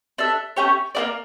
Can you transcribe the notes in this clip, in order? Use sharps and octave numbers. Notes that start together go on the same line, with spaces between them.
D4 A4 E5
A3 C#4 G4 C#5
A#3 E4 A#4 D5